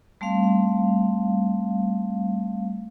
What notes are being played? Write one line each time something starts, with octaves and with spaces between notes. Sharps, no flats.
G3 A3 C4 F5